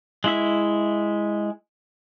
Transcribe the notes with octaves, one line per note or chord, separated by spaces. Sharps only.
G#3 E4 E5